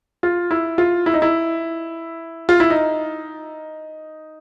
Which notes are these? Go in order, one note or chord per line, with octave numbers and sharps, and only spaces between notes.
F4
E4
F4
E4
D#4
E4
F4
E4
D#4